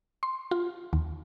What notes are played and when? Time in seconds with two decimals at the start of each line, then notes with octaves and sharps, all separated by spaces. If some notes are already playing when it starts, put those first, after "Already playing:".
0.23 C6
0.51 F4
0.93 D#2